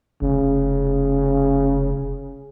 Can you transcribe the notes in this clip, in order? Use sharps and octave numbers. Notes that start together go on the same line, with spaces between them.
F1 C#3